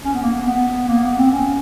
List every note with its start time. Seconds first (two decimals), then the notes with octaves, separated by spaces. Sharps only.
0.05 C#4
0.14 B3
0.23 A#3
0.33 B3
0.47 B3
0.89 A#3
1.04 B3
1.18 C4
1.31 C#4